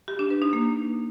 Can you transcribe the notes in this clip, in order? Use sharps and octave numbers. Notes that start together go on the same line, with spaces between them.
G4
D4
B4
D#4
A#3